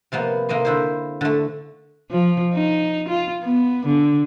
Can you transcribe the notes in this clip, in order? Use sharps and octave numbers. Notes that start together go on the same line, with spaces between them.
C3 F3 A#3 B3
C3 A#3 D#4 D#5 C6
D3 E4 C5
D3 A3
F3
D#4
F4
B3
D3